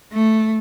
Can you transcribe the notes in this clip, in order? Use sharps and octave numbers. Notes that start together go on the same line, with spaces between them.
A3